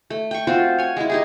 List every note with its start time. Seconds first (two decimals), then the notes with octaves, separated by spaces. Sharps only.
0.10 A3
0.31 G5 C#6
0.47 C4 F4 F#4 C5
0.78 C#5 G#5
0.97 G#3 E4
1.10 D#4 G4 G#4